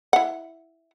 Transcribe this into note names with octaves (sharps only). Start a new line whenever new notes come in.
E4 F#5